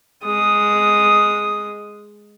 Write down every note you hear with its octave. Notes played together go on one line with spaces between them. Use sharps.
G#3 D#6